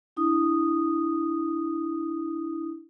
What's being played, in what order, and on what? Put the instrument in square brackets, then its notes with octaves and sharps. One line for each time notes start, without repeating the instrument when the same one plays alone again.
[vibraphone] D4 E4 D#6